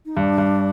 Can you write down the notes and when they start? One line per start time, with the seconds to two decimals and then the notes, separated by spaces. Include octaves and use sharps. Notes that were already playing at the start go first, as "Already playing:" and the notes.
0.05 D#4
0.16 G2 D4
0.38 G2